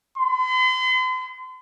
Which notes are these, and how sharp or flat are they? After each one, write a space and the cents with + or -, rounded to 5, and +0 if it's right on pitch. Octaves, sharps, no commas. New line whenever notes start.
C6 -45